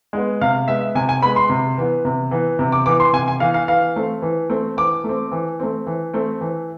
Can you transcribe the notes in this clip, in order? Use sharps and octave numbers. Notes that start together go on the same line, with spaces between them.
G#3 B3
C3 F5
G#3 B3 E5
C3 G#5
G#5
G#3 B3 B5
C6
C3
E3 B3
C3
E3 B3
C3
D6
E3 B3 D6
C6
C3 G#5
G#5
E3 B3 F5
F5
E3 F5
A3 C4
E3
A3 C4
E3 D6
A3
C4
E3
A3 C4
E3
A3 C4
E3